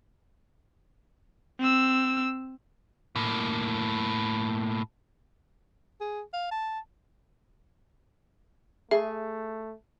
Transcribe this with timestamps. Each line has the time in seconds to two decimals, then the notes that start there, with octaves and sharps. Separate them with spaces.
1.60 C4 E6
3.16 A2 A#3
6.01 G#4
6.33 F5
6.51 A5
8.91 A3 G#4 E5